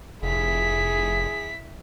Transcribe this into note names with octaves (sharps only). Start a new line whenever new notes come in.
F1 E4 G#4 B6